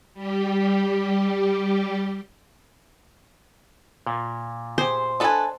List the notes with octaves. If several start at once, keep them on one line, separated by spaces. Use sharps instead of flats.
G3 G4
A#2
G4 G#4 C5
D4 A4 B4 D#5 G#5